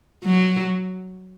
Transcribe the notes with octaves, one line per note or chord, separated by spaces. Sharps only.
F#3